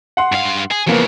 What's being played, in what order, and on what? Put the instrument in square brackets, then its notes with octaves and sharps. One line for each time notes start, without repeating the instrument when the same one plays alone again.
[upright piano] F#5 C6
[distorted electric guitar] G2 F5
G#4
[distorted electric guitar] E2 C#3 [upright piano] F3 A#3 B3